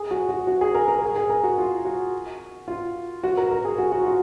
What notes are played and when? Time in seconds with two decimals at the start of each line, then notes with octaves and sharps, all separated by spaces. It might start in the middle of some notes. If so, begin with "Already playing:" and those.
Already playing: G#4
0.11 F#4
0.29 F#4
0.47 F#4
0.61 G#4
0.75 A#4
0.88 A#4
1.02 G#4
1.16 G#4
1.30 A#4
1.44 F#4
1.58 F4
1.85 F#4
2.68 F4
3.24 F#4
3.37 A#4
3.51 A#4
3.65 G#4
3.78 F#4
3.92 F#4
4.01 F4
4.06 F#4